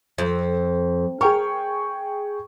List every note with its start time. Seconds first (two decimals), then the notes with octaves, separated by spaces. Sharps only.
0.18 F2
1.21 G#4 A#4 G5 C#6